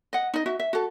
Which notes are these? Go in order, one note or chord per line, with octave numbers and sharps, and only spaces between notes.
D#5 F#5
D#4 D#5
F#4 E5
E5
F#4 A4